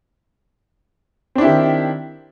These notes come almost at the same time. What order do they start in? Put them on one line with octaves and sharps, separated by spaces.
C4 D4 E4 G4 D#3